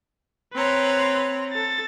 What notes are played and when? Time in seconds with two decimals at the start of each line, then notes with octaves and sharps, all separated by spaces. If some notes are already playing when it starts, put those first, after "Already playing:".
0.54 C4 B4 C#5 A#5 C6
1.52 A4 A6